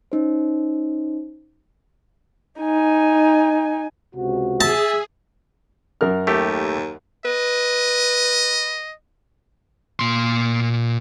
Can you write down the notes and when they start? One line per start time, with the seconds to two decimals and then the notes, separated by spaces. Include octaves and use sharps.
0.12 C#4 D#4 C5
2.60 D#4 G#5
4.16 C#2 C3 F#4
4.61 G#4 E5 A5
6.01 F#2 A#4 F6
6.27 D#2 A3 G4
7.25 B4 D#5
9.99 A#2 C6